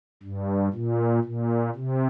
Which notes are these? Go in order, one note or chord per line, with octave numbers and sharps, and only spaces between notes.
G2
A#2
A#2
C3